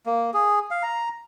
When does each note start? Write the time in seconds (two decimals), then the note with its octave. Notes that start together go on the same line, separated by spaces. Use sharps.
0.06 A#3
0.34 G#4
0.71 F5
0.83 A#5